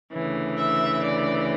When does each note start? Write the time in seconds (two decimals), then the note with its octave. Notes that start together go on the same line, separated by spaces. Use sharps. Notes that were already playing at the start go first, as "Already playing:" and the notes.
0.12 D2 C#3 E3
0.57 E5
1.04 D5